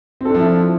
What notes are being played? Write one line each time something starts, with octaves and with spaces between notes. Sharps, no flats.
F3 C4 D4 E4 A4